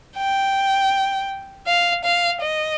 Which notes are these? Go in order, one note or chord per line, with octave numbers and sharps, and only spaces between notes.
G5
F5
F5
D#5